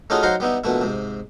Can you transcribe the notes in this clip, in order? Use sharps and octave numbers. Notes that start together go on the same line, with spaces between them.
A3 C#4 D#4 F4 F#4 G#4
F#3 D#4 C5 F5 F#5 A#5
G3 B3 D#4 E4
A#1 B2 A3 E4
G#2 C3